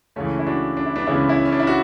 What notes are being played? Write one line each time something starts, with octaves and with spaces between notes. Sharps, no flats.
C#2 C#3 E3 A3 C#4
E4
D4 F#4
D4
E4
B3 D4
C#2 C#3 E3 C#4 E4
C#4 E4
C#4
D4
E4
F#4